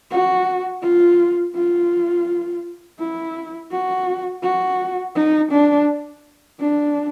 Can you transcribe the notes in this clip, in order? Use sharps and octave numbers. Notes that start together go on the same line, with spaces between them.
F#4
F4
F4
E4
F#4
F#4
D#4
D4
D4